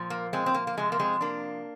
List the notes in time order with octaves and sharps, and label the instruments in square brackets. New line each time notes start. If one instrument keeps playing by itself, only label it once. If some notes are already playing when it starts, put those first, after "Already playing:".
Already playing: [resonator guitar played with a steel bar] A#2 F3
A#3
G#3 C4
C4
A#3
A#3
C3 F3 G#3
A#3
G#3 C4
A#3 D4